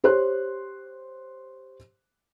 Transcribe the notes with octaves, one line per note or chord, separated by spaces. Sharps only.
G4 C5 C#5 C6 F#6